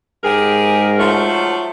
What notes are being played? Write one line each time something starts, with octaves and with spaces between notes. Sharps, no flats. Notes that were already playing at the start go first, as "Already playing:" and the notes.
G#2 G4 G#4 A#4
F3 F#3 A3